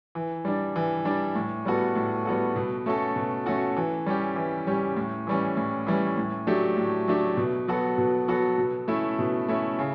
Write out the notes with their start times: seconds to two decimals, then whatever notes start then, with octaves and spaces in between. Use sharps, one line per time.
0.15 E3
0.45 G3 D4
0.76 E3
1.05 G3 D4
1.35 A2
1.65 G3 B3 F#4 A4
1.95 A2
2.25 G3 B3 F#4 A4
2.56 B2
2.86 A3 C#4 F#4 A4
3.16 B2
3.46 A3 C#4 F#4 A4
3.77 E3
4.06 G3 C#4 G4
4.36 E3
4.67 G3 C#4 G4
4.96 A2
5.27 E3 G3 C#4
5.57 A2
5.87 E3 G3 C#4
6.17 A2
6.47 F#3 A3 D4 G4
6.77 A2
7.08 F#3 A3 D4 G4
7.37 B2
7.68 F#3 B3 F#4 A4
7.98 B2
8.28 F#3 B3 F#4 A4
8.58 B2
8.88 A3 C#4 E4
9.19 B2
9.48 A3 C#4 E4
9.79 C#3